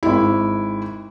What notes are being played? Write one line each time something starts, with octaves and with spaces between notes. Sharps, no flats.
G#1 E4